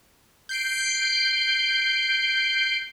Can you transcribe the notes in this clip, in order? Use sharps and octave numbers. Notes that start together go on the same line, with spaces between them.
G6 C7 D7